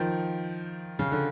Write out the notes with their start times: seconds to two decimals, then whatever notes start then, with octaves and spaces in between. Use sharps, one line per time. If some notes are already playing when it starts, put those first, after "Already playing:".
Already playing: D#3 F3
0.99 C#3
1.12 D3